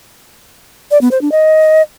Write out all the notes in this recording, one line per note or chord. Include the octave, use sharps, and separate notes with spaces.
D5
B3
C5
D4
D#5